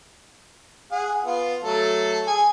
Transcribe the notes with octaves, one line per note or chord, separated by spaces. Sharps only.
G#4 F#5
B3 F4
F#3 A3 A4
G#4 G#5